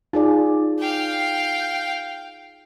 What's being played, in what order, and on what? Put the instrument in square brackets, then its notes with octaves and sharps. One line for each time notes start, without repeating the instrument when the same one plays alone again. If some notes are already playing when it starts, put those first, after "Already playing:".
[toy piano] D#4 [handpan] F4 G#4 D5
[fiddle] F5 G5